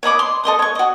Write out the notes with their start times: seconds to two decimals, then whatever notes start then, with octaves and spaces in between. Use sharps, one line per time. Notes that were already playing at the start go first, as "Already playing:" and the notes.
0.03 C#5 D#5 B5 D6
0.19 C6
0.44 A4 D#5 C6 D#6
0.59 C#5 C#6
0.75 F#4 D#5